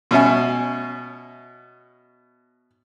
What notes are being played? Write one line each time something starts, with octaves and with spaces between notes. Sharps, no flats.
B2 C#4 E5 G#5